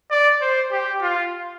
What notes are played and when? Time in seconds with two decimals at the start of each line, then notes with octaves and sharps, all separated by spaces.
0.11 D5
0.41 C5
0.72 G4
1.02 F4